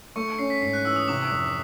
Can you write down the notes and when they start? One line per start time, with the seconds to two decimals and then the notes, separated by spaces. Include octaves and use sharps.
0.16 A3 C#6 C#7
0.39 C#4 C7
0.50 B6
0.61 G#2 C7
0.73 F#6
0.84 E3 E6
0.96 D#6
1.08 C3 D6
1.31 F1